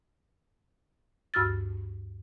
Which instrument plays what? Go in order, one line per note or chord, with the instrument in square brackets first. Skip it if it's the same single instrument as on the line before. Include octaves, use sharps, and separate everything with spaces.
[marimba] D2 G2 F#4 E6 F6 A6